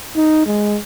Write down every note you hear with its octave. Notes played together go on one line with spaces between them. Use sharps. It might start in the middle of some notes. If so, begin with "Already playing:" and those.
D#4
G#3